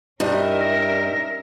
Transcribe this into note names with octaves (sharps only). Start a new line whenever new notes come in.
G2 C#4 D#4 E4 G4 A#4 D5 E5
A#6